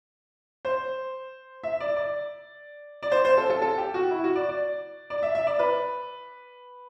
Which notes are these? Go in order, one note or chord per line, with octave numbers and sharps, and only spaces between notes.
C5
E5
D5
D5
D5
C5
C5
A4
A4
A4
G4
F#4
E4
F#4
D5
D5
D5
E5
E5
D5
B4